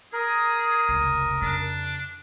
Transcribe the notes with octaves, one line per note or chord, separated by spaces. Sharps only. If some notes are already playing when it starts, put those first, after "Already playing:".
G#4 A#4 D#6
F1 C#2
F2 C#3 D4